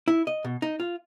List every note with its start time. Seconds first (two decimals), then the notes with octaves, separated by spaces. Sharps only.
0.08 E4
0.27 D#5
0.45 B2
0.62 D#4
0.80 F4